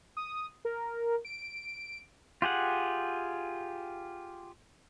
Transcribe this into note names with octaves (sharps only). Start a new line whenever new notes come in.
D#6
A#4
D7
F4 G4 G#4 F#5